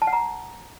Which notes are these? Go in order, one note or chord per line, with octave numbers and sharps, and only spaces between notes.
A5
F#5
A#5